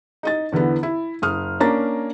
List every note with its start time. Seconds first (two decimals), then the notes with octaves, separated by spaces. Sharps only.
0.23 D#4 D#5 A6
0.52 E2 D3 E3 B3
0.83 E4
1.22 F#1 D#6 F6
1.60 A#3 C#4 D4 A#5 A6